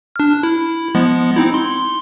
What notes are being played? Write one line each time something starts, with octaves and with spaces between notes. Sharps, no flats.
D4 F6
E4
F3 G#3 B3
C4 D#4 E4
C6